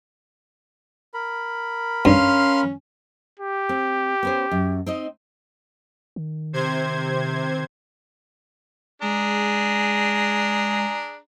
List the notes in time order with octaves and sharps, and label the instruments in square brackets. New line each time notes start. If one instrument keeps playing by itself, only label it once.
[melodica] A#4 B5
[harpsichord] G2 [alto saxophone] C#4 [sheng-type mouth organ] F5 C6
[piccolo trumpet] G4
[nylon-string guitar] C4
B3 C#4 C5
F#2
C4 D#4 D#5
[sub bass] D#3
[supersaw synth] C3 C5 G#6
[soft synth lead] G#3 [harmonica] D4 G#4 A#5